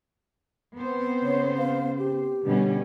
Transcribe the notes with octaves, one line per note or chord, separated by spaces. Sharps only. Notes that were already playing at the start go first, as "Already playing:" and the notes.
B3 C4 C5
C#3 C#5
F5
G4
B2 D3 G3 C#4